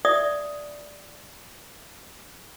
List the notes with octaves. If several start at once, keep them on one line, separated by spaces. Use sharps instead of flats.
D5 E5 D#6